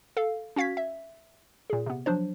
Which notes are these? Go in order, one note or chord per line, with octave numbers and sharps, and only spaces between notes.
A4 F5
C#4 F#4 F5 G#6 B6
E5
A#2 G#4
C3 B3
F3 F#3 D4 C5